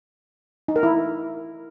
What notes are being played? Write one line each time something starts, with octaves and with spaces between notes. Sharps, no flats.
D#4
A#4
E4